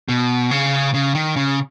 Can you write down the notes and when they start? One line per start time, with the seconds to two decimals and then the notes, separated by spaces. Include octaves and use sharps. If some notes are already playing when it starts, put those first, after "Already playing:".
0.09 B2
0.51 C#3
0.94 C#3
1.15 D#3
1.36 C#3